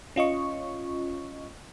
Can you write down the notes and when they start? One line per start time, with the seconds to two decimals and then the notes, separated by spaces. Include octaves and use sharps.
0.16 C#4 F4 D#5 C#6